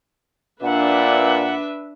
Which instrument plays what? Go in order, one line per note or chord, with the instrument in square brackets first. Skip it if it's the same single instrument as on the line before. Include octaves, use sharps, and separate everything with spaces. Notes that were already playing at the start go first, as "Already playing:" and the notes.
[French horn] A#2 [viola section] D4 B4 E5 [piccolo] F#5